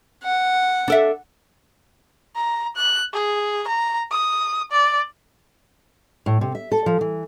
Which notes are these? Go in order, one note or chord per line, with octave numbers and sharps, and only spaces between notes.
F#5
D4 A4 E5
A#5
F#6
G#4
A#5
D#6
D5
A2
C3
E5
A4
F3
E3